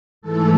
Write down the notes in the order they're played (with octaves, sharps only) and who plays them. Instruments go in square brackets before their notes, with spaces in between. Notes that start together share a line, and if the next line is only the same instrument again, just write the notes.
[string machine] G#2 E3 A3 A4